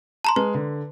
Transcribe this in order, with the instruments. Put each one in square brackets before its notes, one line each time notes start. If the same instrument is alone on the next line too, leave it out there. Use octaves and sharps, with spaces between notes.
[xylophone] A5 A#5 C6
[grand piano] G#3 [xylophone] B4
[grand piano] D3